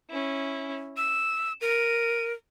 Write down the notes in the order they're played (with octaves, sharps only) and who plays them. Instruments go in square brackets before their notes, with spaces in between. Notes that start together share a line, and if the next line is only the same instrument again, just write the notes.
[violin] C#4 E4
[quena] E6 [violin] E7
[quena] A#4 [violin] D#7